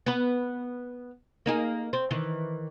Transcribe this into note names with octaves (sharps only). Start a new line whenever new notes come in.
B3 B4
A#3 D#4 G#4
C4
D#3 E3